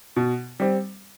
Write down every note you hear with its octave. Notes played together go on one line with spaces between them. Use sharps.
B2
G3 C4